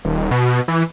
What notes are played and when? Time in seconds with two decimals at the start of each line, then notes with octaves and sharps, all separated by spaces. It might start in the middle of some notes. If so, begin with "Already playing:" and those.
0.05 D#1
0.31 B2
0.68 E3